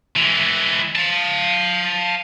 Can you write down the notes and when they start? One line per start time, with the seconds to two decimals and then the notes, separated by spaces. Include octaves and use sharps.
0.16 E3 G#3
0.96 F5 A5